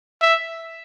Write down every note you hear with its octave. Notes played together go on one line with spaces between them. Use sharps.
E5